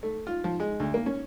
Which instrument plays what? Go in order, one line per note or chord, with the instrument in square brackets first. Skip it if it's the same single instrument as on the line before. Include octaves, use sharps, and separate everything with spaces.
[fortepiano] A3
F4
F3
G#3
D2
A#3
C#4